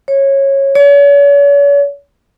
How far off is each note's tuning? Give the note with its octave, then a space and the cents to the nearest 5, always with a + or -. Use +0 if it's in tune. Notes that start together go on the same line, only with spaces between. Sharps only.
C#5 -15
C#5 +40